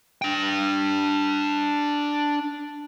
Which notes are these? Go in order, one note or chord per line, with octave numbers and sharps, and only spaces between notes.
D4 G5